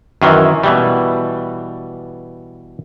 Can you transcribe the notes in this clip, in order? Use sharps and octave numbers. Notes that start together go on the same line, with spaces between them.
F#2 D#3 E3
B2 E3 G3